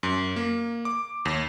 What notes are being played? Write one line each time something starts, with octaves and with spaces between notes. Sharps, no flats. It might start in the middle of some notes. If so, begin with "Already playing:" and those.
F#2
A#3
D6
D#2